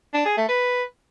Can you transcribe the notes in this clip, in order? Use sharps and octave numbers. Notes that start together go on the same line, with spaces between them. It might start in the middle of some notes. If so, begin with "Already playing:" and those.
D4
G#4
A3
B4